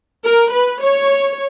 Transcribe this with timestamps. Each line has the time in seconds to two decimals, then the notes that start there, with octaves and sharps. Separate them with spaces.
0.23 A#4
0.52 B4
0.82 C#5